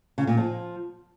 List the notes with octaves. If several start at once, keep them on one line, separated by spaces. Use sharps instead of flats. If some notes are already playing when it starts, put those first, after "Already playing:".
C#3
A#2
F3